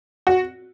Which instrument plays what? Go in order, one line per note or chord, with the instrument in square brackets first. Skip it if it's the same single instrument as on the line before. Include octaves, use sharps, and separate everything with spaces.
[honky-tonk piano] F#4